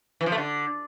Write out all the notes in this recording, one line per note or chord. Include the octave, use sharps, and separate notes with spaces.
E3
F3
A3
D3